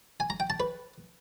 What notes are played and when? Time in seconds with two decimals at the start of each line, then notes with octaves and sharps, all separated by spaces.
0.20 G#5
0.30 A#5
0.40 G5
0.50 A5
0.60 B4